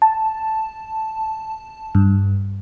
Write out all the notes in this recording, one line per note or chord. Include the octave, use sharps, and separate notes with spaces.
A5
G2